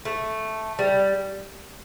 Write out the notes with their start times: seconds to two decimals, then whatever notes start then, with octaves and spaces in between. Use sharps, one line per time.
0.05 A3
0.79 G3